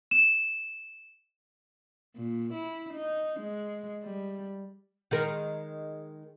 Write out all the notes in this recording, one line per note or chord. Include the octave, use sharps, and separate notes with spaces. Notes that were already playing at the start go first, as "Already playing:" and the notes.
E7
A#2
E4
D#4
G#3
G3
D#3 G#3 A#4